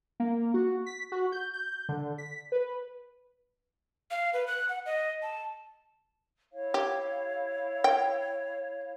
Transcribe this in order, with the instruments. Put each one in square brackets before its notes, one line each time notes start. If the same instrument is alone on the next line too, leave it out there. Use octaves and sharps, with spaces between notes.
[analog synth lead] A#3
F#4
B6
F#4
G6
G6
D3
B6
B4
[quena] F5
B4
F#6
F#5
D#5
A5
[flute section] E4 C#5 F5
[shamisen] G4
G5